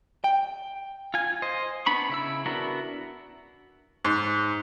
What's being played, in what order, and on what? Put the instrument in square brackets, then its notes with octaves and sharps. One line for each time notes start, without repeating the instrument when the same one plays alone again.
[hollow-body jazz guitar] G5
[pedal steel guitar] F4 G#5
C5 D#5
B3 D4 B5 C#6
C#3 E4 E6
B3 D4 E4 F#4 A#4
[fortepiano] G#2